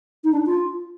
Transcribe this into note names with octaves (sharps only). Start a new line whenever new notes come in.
D#4
D4
F4